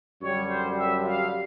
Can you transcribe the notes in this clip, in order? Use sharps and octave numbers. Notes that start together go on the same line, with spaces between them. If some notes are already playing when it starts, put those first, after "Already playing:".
F#2 D3 G3 C#5
C5
E5
F5